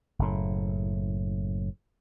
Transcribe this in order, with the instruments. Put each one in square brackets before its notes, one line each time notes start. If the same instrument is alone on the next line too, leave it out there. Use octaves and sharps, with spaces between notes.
[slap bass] F#1 A2